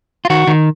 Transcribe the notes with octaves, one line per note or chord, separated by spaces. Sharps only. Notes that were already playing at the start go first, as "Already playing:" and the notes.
F4
D#3 F#4
D#3